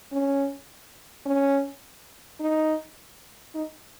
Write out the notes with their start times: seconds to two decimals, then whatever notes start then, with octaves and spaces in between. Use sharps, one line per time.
0.12 C#4
1.26 C#4
2.40 D#4
3.55 D#4